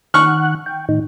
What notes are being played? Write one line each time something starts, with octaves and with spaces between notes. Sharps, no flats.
D#3 F#5 C#6 F6 F#6
G5
A2 D#3 D#4